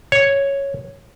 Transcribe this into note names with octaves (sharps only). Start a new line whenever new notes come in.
C#5